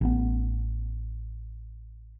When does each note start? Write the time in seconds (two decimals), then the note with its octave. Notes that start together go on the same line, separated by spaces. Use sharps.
0.01 A1 B3